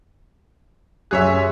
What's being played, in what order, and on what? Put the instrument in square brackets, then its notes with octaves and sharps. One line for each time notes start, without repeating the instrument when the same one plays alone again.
[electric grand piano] F#2 G4 F#6 [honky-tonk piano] G#4 C#5 E5